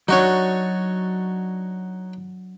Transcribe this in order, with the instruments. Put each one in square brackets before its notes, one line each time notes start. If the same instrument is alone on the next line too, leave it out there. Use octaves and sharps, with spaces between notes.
[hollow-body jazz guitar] F#3 D4 [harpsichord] D#4 F#4 C#5